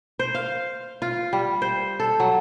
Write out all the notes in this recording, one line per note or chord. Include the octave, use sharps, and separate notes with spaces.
C5
F5
F4
G3
C5
A4
F#3